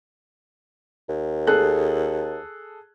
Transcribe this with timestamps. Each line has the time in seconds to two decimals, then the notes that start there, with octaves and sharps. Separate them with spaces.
1.09 D#2
1.47 G#4 A4 F#6